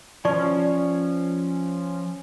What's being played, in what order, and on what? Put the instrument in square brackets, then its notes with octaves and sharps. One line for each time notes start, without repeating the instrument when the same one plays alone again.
[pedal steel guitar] F3 C#4 [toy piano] D5 A5 C#6